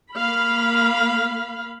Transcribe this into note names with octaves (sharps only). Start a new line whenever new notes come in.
A#3 F5 B5